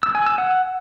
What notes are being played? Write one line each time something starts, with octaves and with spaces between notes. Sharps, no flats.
E6
G#5
E6
F#5